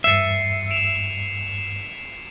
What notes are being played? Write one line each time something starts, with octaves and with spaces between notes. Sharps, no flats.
E2 G2 E5 A6 C7 C#7 D#7
D7 E7 F7